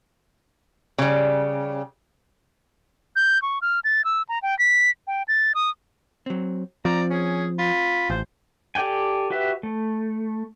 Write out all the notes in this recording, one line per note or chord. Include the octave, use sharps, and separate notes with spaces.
C#3 G3
G6
C#6
F6
A6
E6
A#5
G5
B6
G5
A6
D#6
F#3 C4
F3 C4 D5 A#5
C#4 G#4
F4 B5
A1 C5
G4 A4 D5 G5 G#5
F#4 G4 B4 E5
A3